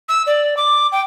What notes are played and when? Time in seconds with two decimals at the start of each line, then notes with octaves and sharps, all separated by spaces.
0.09 E6
0.27 D5
0.57 D6
0.92 G5